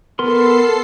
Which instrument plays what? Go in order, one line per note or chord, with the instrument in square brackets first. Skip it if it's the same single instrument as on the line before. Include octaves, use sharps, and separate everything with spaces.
[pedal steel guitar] B3 A#4 C6 [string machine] A4 C7